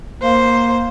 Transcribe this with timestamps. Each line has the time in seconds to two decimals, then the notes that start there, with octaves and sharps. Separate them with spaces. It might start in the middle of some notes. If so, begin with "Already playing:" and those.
0.22 A#3 C5